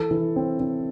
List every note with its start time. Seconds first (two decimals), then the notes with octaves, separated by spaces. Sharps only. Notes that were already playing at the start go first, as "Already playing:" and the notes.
Already playing: E3 A4
0.11 E3
0.36 C4
0.60 C4